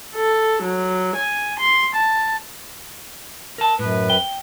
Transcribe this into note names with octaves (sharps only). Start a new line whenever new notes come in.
A4
F#3
G#5
C6
A5
A#4 A5
F#2 A2 B4
G5